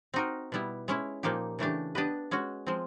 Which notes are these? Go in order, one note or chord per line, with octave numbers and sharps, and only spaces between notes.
C4 D#4 F#4 A#4
B2 G3 B3 E4
G#3 C#4 E4
A#2 F3 A#3 D#4 G4
C#3 E3 A3 D4 G4
B3 D4 G4 B4 D#5
G#3 C#4 F#4
F3 G#3 C4